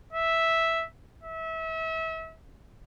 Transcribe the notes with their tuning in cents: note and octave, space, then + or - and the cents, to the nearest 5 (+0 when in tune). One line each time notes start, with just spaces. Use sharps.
E5 -5
E5 -30